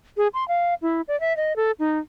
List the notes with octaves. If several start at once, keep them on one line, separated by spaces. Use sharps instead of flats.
G#4
C6
F5
E4
D5
E5
D#5
A4
D#4